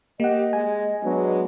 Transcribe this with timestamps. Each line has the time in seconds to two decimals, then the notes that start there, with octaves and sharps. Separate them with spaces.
0.20 A#3 G4 D#5 F#5
0.53 G#3 G#5
1.04 F#3 G#3 B3 D4